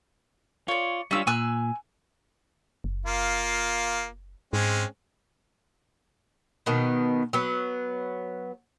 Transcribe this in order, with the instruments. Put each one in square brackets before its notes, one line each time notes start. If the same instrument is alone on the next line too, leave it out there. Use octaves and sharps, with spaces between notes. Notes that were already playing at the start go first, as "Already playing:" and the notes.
[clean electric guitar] F4 [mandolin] C#5 D5
[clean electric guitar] G3 D4 F4 [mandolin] C#4 E6
[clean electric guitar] A#2 [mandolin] G#5 E6 F#6
[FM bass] F#1
[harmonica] A#3 F4
[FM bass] G#2 [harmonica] G#3 C4 C#4
[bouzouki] B2 D#3 B3
F#3 B3